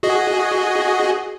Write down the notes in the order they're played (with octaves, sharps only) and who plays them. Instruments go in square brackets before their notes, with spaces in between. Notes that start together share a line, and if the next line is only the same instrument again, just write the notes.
[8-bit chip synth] F#4 G#4 D#5